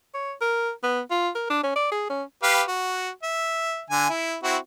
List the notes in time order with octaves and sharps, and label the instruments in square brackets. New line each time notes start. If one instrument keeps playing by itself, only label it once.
[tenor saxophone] C#5
A#4
B3
F4
A#4
D4
C#4
D5
G#4
C#4
[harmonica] G4 B4 F5
F#4
E5
D3 G#5
E4
C4 E4 F#4